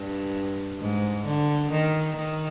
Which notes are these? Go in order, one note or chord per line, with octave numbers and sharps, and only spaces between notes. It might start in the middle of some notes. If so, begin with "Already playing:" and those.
Already playing: G2
G#2
D3
D#3
D#3